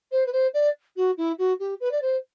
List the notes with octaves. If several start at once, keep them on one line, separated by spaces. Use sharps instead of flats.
C5
B4
C5
D5
F#4
E4
F#4
G4
B4
D5
C5